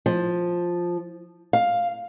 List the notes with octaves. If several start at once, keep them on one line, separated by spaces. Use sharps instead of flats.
F3
F5